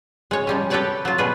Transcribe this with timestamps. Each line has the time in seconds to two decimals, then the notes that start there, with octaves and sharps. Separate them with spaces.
0.31 G#3 C#5
0.47 F3 G3 C#4
0.70 G4 A4 B4 C#5 D5 A5
1.05 F#3 F4
1.18 B2 G3 G#4 B4